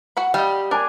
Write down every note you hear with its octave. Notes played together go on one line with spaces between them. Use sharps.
F#4 F#5 B5
G3 D#5 F5
D4 A#4 G#5